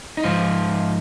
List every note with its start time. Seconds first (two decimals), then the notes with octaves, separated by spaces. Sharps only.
0.17 D#4
0.23 G#2 F3 F4